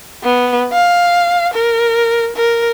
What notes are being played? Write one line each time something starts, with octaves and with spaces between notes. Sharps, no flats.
B3
F5
A#4
A#4